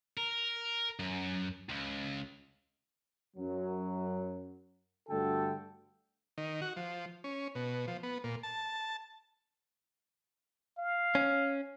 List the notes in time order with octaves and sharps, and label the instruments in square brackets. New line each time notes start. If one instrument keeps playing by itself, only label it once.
[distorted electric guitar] A#4
F#2
C#2
[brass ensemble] F#2 F#3
G2 D3 A3 F#4 A4 G5
[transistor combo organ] D#3
F#4
F3
C#4
B2
F3
B3
A#2
A5
[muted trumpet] F5
[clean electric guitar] C#4